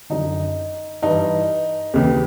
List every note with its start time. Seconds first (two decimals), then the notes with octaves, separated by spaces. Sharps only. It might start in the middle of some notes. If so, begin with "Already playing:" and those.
0.10 F#2 D3 D#4
1.03 G2 E3 D#4
1.94 D#2 C#3 E3